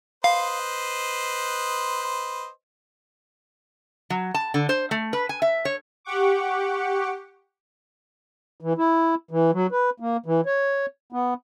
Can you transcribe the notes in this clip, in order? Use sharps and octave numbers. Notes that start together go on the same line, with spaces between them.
B4 C5 D#5 F5
F#3
A5
D3
C5
A3
B4
G#5
E5
C#5
G4 F#5 C#6 D6
E3
E4
E3
F#3
B4
A#3
E3
C#5
B3